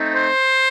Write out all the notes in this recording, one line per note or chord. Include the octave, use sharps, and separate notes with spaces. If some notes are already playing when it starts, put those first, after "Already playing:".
Already playing: A3 C4 D#4
C5